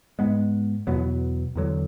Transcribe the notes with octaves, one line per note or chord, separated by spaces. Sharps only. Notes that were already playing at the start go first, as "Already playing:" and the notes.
G#2 G#3 B3
E2 B2 F#3 B3
E2 D3 F#3